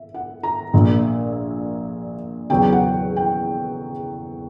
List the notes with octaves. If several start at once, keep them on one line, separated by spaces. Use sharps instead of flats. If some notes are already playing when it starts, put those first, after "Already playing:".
Already playing: E5
F#5
A#5
A#1 A#2 A#3
E2 C#3 F#3 B3 G5
F#5
G5